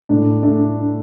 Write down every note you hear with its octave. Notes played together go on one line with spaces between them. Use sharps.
A2 D4
A3 D4